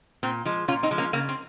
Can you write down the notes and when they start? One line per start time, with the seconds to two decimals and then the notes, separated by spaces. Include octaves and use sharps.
0.23 A#2 C4
0.45 F3 G#3
0.68 A#2 C#4 F4
0.83 C4 D#4
0.91 F3 G#3
0.98 A#3 C#4
1.13 C#3 A#3
1.29 C4